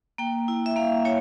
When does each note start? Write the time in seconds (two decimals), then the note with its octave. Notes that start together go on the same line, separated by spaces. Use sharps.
0.18 A#3 G5
0.48 E4
0.66 E5
0.76 A#3 F5
1.05 E4 C#5